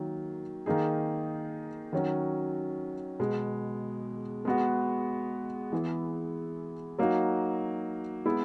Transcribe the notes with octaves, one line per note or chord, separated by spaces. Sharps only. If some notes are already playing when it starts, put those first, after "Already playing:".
Already playing: D#3 F#3 A#3
D#3 A#3 D#4 G#4
D#3 F#3 C#4 F#4
B2 G#3 B3
G#3 B3 F#4
E3 B3 E4 G#4
F#3 A#3 D#4 F#4
G#3 B3 E4 G#4